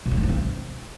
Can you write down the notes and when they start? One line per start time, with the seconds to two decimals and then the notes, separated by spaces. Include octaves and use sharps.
0.06 B2
0.11 C#3
0.17 D3
0.23 A#3
0.29 C4